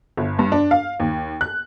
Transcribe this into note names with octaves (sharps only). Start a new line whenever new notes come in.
G1
G2
D4
F5
D#2
F#6